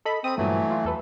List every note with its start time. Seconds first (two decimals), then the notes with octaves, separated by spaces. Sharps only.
0.05 A4 D#5 B5
0.24 C4 D#6 D#7
0.38 G2 A#2 E3 F#3 A3
0.71 F4
0.85 E2 A4 B4